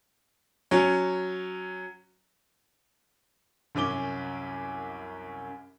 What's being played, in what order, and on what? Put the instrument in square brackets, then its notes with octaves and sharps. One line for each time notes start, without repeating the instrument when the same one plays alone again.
[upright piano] F#3 C#4
[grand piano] C2 F#2 C#4 D6 G7